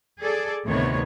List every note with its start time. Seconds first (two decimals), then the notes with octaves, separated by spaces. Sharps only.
0.19 G#4 A4 D5
0.64 D2 A2 C3 D#3 B3 C#5